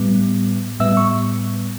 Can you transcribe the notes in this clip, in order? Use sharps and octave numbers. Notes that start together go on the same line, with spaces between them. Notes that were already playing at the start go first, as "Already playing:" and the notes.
Already playing: A2 G3 B3
A2 G3 B3 E5 E6
C#6